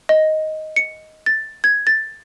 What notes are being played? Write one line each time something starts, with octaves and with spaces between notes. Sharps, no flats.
D#5
C#7
A6
G#6
A6